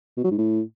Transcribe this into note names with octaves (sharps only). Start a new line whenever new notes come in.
B2
F#3
G#2
A2